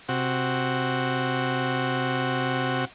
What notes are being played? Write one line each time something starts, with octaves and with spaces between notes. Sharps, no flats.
C3 F#4